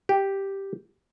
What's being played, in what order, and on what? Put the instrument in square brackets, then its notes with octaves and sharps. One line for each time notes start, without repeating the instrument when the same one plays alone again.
[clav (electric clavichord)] G4